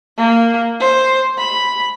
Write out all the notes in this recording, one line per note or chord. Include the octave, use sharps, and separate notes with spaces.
A#3
C5
B5